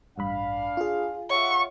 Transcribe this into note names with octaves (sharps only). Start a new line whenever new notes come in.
A1 G2 D4 F5 B5
F4 G#4
F4 C#5 E5 F#5 C#6